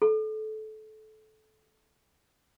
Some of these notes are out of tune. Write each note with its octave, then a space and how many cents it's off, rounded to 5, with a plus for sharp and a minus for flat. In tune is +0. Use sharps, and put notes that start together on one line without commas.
A4 -20